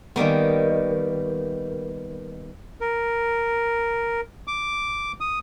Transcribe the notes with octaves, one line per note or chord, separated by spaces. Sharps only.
D#3 G3 A#3 B3
A#4
D6
D#6